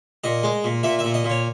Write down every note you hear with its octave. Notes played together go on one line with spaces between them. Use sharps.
A#2 D#5
G#3
A#2
A#2 E5
E5
A#2
D#5
A#2
C#5